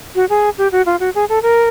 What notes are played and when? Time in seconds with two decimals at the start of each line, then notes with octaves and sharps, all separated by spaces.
0.15 F#4
0.30 G#4
0.58 G4
0.72 F#4
0.86 F4
1.00 F#4
1.15 G#4
1.29 A4
1.43 A#4